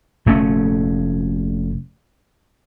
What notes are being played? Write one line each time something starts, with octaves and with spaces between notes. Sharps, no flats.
F1 A3 C#4